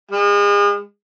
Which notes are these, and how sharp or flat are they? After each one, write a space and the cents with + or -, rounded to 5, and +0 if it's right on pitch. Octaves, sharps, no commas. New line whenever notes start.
G#3 -35